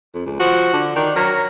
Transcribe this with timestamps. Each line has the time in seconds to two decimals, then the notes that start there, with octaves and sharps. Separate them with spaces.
0.14 F2
0.26 C#2
0.40 F3 F#4
0.73 D3
0.96 D#3 D4
1.16 F#3 A#4